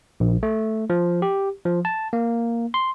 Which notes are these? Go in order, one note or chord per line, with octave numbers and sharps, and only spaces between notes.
A#1
A3
F3
G4
F3
A5
A#3
C6